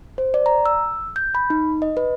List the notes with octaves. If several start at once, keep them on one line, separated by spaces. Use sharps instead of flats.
C5
D5
A#5
E6
G6
B5
D#4
D#5
B4